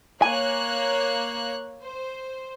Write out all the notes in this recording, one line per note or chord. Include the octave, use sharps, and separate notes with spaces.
A#3 C#5 G#5 F#6
C5